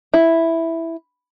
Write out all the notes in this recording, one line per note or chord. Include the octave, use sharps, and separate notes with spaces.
E4